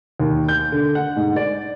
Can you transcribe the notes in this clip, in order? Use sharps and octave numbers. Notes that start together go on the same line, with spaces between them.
D#2
G6
D3
F#5
G#2
D5